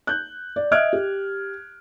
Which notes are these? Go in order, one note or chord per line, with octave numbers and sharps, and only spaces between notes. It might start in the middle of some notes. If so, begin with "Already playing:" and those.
F#6 G6
D5
D#5 E5 F6 F#6 G#6 D7
G4